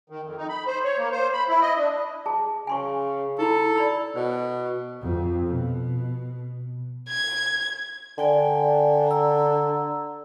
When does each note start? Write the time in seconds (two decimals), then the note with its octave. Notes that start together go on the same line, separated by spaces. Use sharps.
0.10 D#3
0.25 F2
0.37 D#4
0.49 B5
0.67 C5
0.84 C#5
0.98 A#3
1.12 C5
1.33 B5
1.48 E4
1.62 D#5
1.77 D4
2.26 G#4 A5
2.67 C#3 G#5 C6 C#6
3.39 D#4 E4 A4 B5
3.76 D5 B5 E6
4.16 B2 C5
5.01 F2
5.48 B2
7.09 G#6
8.18 D3 D5 G5 G#5
9.07 A#5 E6